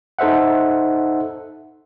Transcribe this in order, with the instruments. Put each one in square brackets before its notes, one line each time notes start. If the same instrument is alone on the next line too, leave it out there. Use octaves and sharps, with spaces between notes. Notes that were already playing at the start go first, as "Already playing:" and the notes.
[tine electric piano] D#4 A4 C5 E5 F#5